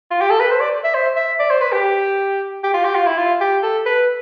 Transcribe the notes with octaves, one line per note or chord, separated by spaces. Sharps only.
F4
G4
A4
B4
C5
D5
E5
C5
E5
D5
C5
B4
G4
G4
F4
G4
F4
E4
F4
G4
A4
B4